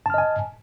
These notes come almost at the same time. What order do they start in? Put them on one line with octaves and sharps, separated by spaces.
A5 F6 D#5 G#5